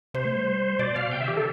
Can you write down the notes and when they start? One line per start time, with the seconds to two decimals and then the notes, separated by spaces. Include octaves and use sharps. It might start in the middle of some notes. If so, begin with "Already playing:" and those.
0.14 C3 C5
0.25 A3
0.36 G3
0.79 B2 D5
0.95 B2 F5
1.11 C3 G5
1.20 D3 E5
1.28 E3 G4
1.36 D3 A4